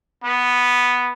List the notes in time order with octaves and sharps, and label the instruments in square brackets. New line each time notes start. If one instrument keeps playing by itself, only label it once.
[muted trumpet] B3